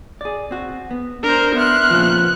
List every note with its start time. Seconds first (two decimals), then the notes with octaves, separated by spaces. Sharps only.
0.21 G#4 D5
0.51 C4 F#4
0.91 B3
1.23 D4 A#4 C5
1.55 B3 E5 C6 F6 F#6
1.90 A#2 C#3 F3